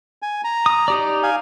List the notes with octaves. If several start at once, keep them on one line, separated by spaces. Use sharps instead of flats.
G#5
A#5
D#6
D#4 G4 D5
F5 G#5